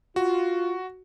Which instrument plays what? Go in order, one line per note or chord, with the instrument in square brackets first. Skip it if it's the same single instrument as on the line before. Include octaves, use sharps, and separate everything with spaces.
[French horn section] F4 [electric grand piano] F#4